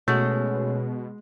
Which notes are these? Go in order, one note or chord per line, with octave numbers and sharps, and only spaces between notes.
B2 G#3 A3 C#4 F#4